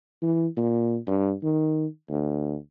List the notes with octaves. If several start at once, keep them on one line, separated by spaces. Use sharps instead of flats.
E3
A#2
G2
D#3
D2